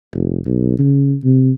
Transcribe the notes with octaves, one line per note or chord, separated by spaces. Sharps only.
F1
B1
C#3
C3